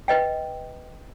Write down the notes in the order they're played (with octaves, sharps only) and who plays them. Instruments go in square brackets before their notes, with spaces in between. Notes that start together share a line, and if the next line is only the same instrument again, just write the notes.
[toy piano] B4 D#5 G5